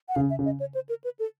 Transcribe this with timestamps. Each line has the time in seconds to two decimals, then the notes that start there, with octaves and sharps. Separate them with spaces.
0.09 F#5
0.16 C#3 F5
0.30 E5
0.39 C#3
0.45 D#5
0.60 C#5
0.75 C5
0.89 A#4
1.04 B4
1.19 A4